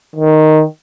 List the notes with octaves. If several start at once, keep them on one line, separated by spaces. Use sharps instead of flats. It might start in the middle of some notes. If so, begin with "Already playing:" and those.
D#3